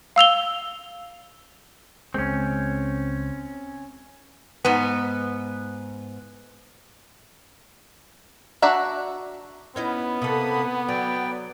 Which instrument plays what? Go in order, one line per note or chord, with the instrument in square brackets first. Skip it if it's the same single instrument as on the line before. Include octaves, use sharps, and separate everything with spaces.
[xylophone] F5 E6 F7 G7
[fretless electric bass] C#2 G#3 [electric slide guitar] C4 C#4
[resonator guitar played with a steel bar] G#2 B3
[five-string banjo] D4 F#4 E5 F#5 A#5
[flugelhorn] B3 [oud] C#4 D#4 E4
[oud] C3 A4 [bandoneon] A#3 B5 D#6
[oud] F#3 [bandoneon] D5 G5